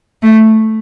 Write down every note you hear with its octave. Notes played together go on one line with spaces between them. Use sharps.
A3